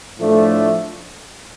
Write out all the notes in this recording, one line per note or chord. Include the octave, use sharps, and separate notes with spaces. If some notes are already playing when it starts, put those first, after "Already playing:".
A2 F3 A3 D4